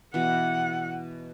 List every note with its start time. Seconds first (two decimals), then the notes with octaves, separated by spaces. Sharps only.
0.14 B2 E3 F#5